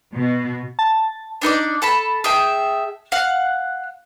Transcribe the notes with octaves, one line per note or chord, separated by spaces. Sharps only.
B2
A5
D4 D#4 B4 D5
A4 A5 B5
G#4 E5 G5 A5
F5 F#5